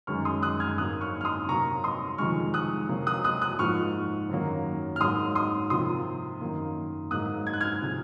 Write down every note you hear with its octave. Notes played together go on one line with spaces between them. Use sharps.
F#2 D#3 G#3 C#6 F6
C6 D#6
D#6 F#6
F6 G#6
G#2 F#3 A#3 D#6 F#6
C#6 F6
F6
C6 D#6
C3 F#3 A#3 A#5 C#6
C6 D#6
F2 C3 D#3 G#3 C#6 F6
D#6 F#6
C3 F#3 A#3
D#6 F#6
D#6 F#6
D#6 F#6
G#2 F3 A#3 C#6 F6
F#2 D#3 F#3 A#3
F6
G#2 F#3 A#3 C6 D#6
C6 D#6
C3 F3 A#3 C6 D#6
F#2 D#3 A#3
G#2 F#3 A#3 D#6 F#6
G#6
F#6
F6 G#6
C3 F3 G#3